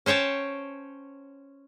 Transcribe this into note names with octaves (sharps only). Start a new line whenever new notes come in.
C#4 C5 C#5 G5 A5